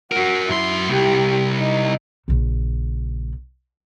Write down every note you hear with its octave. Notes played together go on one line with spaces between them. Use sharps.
F#4 A#4 F#5
F#2 E4 C6
C2 G4
D#4
A#1 C#3